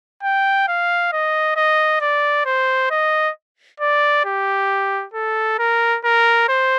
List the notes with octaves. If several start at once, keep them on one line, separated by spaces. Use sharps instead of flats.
G5
F5
D#5
D#5
D5
C5
D#5
D5
G4
A4
A#4
A#4
C5